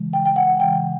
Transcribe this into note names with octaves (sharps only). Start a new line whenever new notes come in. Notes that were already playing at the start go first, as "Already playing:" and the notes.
Already playing: C#3 E3 G#3
G5
G5
F#5
C#3 E3 G#3 G5